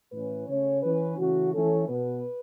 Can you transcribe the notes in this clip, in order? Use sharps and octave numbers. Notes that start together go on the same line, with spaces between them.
A2 E3 C#4 B4
C#3 A3 C#4 C#5
E3 C#4 B4
C#3 E3 A3 C#4 F#4
E3 A3 C#4 A4
B2 B3 B4